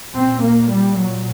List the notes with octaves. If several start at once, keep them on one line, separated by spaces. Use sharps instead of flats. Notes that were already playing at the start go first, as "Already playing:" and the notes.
A#2 C4
A#3
G3
F#3